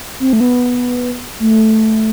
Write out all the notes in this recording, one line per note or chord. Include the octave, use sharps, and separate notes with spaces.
C4
A3
B3
A3